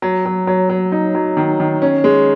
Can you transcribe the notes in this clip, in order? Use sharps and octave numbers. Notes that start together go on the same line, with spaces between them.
F#3
F#3
F#3
F#3
D#4
F#3
D#3
D#3
C#4
G#3